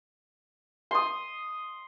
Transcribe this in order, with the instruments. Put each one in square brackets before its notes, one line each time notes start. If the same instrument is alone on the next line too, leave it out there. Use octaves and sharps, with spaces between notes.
[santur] C6 D#6